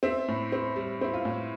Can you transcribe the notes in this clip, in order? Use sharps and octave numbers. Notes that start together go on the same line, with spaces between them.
C4 E5
A2
C4
G3
C4 E4
F4
A2